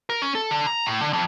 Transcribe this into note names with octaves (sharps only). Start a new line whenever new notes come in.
A#4
C#4
A4
D3
A#5
A2
D3
F2